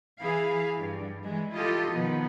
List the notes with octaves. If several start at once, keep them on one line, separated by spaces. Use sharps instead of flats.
E3 E4 G#4 F5
G2
E3 G#3
E4 F4 G4 A4 D#5
B2 D#3 F3 B3